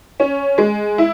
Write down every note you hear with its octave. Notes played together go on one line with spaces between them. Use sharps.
C#4
G#3
E4